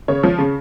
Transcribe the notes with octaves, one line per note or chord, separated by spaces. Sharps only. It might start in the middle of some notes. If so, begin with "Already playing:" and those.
C#3 C#5
F3
C#3